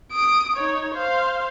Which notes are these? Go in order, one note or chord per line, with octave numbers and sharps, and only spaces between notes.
D#6 D7
D#4 C#5
C5 F5